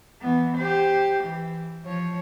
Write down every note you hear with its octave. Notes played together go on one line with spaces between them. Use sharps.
E3 B3
G4 C5
E3
F3 C#5